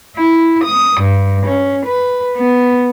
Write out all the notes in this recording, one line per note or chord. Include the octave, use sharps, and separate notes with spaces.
E4
D#6
G2
C#4
B4
B3